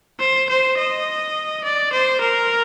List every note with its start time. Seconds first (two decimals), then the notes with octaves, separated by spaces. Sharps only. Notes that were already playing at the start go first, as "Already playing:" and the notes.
0.20 C5
0.49 C5
0.77 D#5
1.64 D5
1.92 C5
2.21 A#4